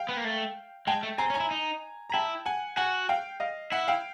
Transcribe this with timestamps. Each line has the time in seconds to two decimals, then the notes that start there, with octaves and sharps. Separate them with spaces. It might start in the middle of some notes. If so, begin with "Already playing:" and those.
Already playing: F5 G5
0.09 B3
0.17 A#3
0.24 A3
0.87 G#3 G5 A5
1.03 A3
1.18 C4 G#5 A#5
1.30 C#4
1.34 G#5 A#5
1.40 E4
1.51 D#4
2.10 A#5
2.13 E4 G5 A5
2.46 F#5 G#5
2.77 F#4 F#5 G#5
3.09 F5 G5
3.40 D#5 F5
3.72 E4 E5 F#5
3.88 F5 G5